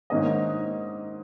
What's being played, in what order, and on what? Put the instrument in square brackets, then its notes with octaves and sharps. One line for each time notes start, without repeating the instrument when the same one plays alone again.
[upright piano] G#2 D#3 A#3 C#4 D#5